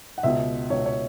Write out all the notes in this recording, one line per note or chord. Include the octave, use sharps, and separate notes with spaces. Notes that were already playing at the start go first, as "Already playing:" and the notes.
F#5
C#2 B2 E5
C#2 B2 C#5
C#5